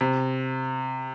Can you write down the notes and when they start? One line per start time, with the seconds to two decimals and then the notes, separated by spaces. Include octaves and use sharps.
0.01 C3